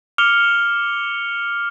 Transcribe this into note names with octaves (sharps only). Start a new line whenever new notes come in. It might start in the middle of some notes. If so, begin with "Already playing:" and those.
D6 F6 C#7 F7 G7